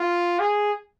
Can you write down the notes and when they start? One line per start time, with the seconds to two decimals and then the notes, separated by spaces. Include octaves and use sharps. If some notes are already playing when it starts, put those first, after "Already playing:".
Already playing: F4
0.40 G#4